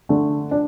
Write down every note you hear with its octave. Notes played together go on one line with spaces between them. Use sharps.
D3 A3 D4
D4